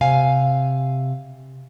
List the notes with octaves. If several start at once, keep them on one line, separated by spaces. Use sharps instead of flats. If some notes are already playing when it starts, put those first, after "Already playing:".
C3 F5 G#5